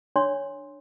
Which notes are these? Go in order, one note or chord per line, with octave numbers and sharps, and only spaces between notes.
D4 C#5 C6